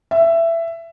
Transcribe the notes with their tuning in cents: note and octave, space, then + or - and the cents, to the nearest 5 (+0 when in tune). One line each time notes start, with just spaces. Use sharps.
E5 +15